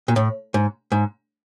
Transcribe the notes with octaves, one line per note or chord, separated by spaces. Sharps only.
A#2
A2
G#2
G#2